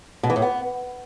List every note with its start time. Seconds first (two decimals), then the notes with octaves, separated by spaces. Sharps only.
0.23 B2
0.30 E3
0.36 A2
0.42 B3